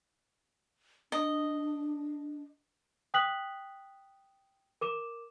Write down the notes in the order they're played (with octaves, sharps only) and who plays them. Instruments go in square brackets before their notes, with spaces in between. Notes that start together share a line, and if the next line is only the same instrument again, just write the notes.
[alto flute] D4 [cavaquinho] D#5
[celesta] G5 D#6 F#6 B6 F#7
A#4 D6 E7